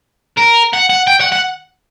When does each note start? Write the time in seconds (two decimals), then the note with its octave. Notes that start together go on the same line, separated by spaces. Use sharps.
0.37 A#4
0.73 F#5
0.90 F#5
1.07 G5
1.20 F#5
1.32 F#5